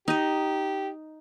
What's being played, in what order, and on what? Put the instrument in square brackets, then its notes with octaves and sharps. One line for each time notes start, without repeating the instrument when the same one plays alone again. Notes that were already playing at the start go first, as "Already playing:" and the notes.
[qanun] D#4 D#5 [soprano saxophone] G4